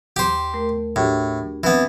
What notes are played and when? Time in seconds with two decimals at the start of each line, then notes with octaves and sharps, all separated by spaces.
0.16 D#2 G4 C5 G5
0.54 A3 A#4
0.96 A2 D4 F#4 G4
1.64 E3 B3 C4